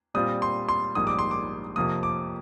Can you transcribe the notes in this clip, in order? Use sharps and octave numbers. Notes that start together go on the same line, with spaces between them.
A#2 G3 C4 F4 D#6
C6
C6
A#1 G#2 G3 A#3 D#6
D6
C6
D6
F2 C3 F3 A#3 D#6
D6